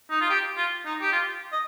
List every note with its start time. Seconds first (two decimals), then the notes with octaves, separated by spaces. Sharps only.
0.10 D#4
0.21 F4
0.30 G4
0.57 F4
0.85 D#4
1.01 G4
1.12 F4
1.52 D#5